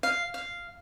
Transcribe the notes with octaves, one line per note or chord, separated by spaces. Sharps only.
F5
F5